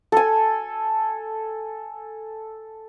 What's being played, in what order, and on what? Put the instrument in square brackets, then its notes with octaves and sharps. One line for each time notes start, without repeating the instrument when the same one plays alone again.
[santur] A4 G#5